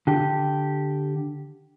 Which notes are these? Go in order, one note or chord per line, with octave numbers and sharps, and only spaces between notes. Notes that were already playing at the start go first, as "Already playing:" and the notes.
D3 G4